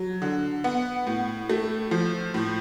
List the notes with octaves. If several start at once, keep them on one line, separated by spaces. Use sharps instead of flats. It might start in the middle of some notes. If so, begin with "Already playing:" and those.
Already playing: F#3
D3
B3
A2
A3
F3
A2